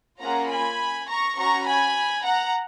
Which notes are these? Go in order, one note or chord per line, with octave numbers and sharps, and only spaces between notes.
A#3 C#4 F4 G#4 F#5 A#5
G#5 B5
A#5 C#6
C#4 F#4 A#5 C#6
G#5 B5
F#5 A#5